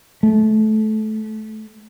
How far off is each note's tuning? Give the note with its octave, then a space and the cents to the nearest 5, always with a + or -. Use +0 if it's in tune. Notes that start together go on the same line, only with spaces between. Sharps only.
A3 -20